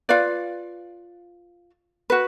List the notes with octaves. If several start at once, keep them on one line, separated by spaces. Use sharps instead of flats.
F4 B4 D5 F5
F#4 B4